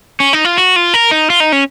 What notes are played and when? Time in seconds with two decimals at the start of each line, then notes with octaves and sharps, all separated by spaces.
0.20 C#4
0.33 D#4
0.45 F4
0.58 F#4
0.76 F4
0.94 A#4
1.11 D#4
1.30 F4
1.40 D#4
1.52 C#4